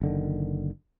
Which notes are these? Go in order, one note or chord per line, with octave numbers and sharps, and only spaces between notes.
F#1 D3 D#3